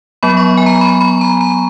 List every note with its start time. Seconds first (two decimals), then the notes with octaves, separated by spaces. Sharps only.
0.23 F#3 B3 B5
0.37 C#6
0.57 G#5
0.66 A#5
0.81 B5
1.01 B5
1.21 A#5
1.41 A#5